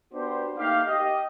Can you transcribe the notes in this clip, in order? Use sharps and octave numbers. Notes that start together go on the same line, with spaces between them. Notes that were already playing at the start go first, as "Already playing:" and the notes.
B3 D4 F#4 G4 C5
A3 A#3 D#4 G4 F5
G4 D#5